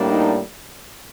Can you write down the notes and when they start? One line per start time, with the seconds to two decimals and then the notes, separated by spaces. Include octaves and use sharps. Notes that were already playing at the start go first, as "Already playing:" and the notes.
Already playing: A2 G3 A#3 D4
0.11 D#4